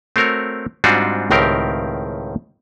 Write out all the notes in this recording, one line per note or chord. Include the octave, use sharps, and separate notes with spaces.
A3 C4 F#4 A#4 C#5
G#2 G3 C4 D4 F4 F#4
C#2 A2 D#3 C4 G4 A#4